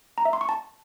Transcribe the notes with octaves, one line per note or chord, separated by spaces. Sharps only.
A#5
E5
C6
C#6
A5